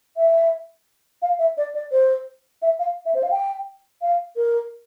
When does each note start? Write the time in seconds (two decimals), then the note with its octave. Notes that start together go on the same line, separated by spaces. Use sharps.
0.17 E5
1.22 F5
1.39 E5
1.57 D5
1.74 D5
1.92 C5
2.62 E5
2.79 F5
3.06 E5
3.15 C5
3.23 F5
3.31 G5
4.02 F5
4.36 A#4